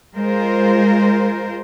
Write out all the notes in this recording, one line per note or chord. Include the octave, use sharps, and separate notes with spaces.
G#3 F4 A#4 C5